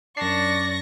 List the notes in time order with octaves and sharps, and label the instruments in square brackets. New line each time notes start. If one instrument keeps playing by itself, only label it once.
[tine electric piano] F#2 C7 [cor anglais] D4 [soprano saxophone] D5 [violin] C#6 A#6